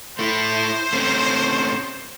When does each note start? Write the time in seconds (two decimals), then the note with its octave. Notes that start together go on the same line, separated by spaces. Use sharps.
0.19 A3 E4 C5
0.93 A3 C4 C#4